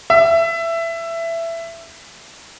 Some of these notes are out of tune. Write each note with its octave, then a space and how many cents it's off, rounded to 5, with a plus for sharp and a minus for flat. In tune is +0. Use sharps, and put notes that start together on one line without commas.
E5 +15